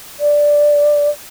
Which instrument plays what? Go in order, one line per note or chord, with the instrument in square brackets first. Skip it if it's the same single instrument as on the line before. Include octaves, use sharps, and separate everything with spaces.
[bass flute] D5